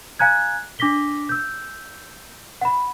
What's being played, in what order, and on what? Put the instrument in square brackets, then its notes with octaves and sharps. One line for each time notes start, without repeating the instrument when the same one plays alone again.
[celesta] F5 G#5 A#5 F#6 G#6
D4 D6 A#6 B6 G7
E6 G6
F#5 B5